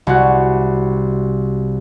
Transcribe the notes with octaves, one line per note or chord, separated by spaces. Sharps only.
C2 F#4